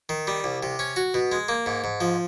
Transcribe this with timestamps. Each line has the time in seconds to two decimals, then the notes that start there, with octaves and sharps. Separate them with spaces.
0.09 D#3
0.27 G3
0.44 C2
0.63 C3
0.79 C#4
0.96 F#4
1.14 B2
1.32 G#3
1.49 A#3
1.66 G#2
1.84 G#2
2.00 F3